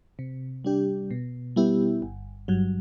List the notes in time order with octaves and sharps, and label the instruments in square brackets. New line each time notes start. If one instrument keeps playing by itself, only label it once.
[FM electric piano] C3
G3 D4 G4
B2
G3 B3 E4 G4
G1
G2 F#3